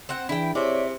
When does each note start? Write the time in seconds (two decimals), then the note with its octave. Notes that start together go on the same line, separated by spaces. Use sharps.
0.09 C4 C5 F#5
0.29 E3 D4 E4 G#4 G5
0.55 C3 C4 E4 G#4 C#5 D5 E5